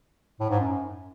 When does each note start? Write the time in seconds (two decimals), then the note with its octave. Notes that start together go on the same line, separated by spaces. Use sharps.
0.40 A2
0.50 G#2
0.59 F#2